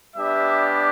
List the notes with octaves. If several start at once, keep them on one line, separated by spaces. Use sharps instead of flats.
G3 B3 D4 G4 E5